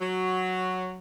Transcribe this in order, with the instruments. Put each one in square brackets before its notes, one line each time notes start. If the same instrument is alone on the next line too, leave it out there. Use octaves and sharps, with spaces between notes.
[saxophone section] F#3